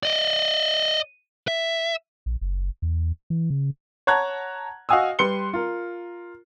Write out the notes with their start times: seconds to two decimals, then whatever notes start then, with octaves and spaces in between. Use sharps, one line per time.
0.03 D5 D#5
1.48 E5
2.26 A#1
2.41 F#1
2.82 E2
3.30 E3
3.50 C#3
4.07 C#5 F#5 A5 A#5 F#6 G#6
4.89 F#4 D#5 F5 G#5 D#6 E6
5.19 G3 B4 C6 C#7 G7
5.53 F4 A#4